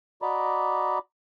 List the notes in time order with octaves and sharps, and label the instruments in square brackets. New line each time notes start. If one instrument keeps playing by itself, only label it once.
[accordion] F#4 D5 D#5 A#5 B5 D6